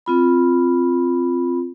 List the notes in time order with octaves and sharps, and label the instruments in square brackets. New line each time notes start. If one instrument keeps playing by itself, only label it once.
[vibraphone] C4 F4 B5